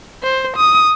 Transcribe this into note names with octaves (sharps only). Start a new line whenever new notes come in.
C5
D#6